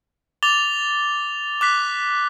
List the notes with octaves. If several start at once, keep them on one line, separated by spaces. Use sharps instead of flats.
D6 A6 F7 G7
D6 F#6 B6